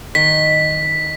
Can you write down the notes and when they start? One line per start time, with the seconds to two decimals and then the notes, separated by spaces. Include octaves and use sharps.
0.15 D#3 B6